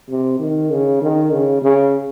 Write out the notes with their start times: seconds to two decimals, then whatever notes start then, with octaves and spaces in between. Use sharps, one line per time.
0.10 C3
0.40 D#3
0.71 C#3
1.02 D#3
1.32 C#3
1.62 C#3